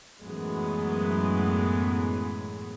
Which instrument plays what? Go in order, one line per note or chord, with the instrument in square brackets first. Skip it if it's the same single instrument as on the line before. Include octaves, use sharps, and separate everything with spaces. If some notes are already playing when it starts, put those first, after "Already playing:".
[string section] F#2 A2 E3 F#3 G#3 B3